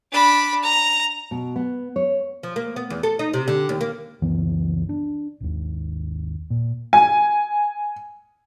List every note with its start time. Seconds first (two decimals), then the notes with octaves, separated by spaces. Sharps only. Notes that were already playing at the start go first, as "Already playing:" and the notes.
0.12 D4 B5
0.64 A#5
1.31 B2
1.56 B3
1.96 C#5
2.43 F3
2.56 A#3
2.76 B3
2.90 E2
3.03 A4
3.19 D#4
3.34 C3
3.48 D3
3.69 D#2
3.81 A#3
4.22 C#2 F#2 E3 B3
4.89 D4
5.40 G#1 D#2
6.50 A#2
6.93 G#5